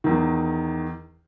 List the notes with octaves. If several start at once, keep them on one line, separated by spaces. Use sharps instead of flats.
E2 D#3